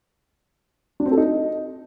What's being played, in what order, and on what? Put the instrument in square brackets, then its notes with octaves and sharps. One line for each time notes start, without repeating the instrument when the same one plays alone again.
[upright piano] D4
C4
A4
D#4